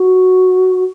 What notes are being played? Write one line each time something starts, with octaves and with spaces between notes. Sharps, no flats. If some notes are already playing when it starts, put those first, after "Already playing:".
Already playing: F#4